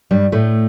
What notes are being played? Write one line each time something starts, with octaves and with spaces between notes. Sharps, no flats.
G2 G3
A2 A3